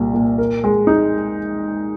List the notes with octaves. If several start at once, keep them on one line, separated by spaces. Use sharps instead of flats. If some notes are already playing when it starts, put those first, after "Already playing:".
Already playing: C2 A#2
A#2
A#4
G#3
D#4